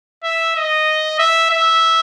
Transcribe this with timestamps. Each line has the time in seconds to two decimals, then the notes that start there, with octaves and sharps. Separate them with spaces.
0.24 E5
0.56 D#5
1.19 E5
1.50 E5